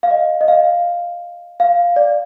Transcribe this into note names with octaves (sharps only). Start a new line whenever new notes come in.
F5
D#5
D#5
F5
F5
D5